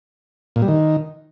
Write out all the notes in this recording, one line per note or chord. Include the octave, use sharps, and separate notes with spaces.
A#2
G3
D#3